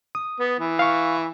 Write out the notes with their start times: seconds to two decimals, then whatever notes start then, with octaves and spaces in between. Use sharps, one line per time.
0.15 D#6
0.39 B3
0.59 E3
0.79 F5 C#6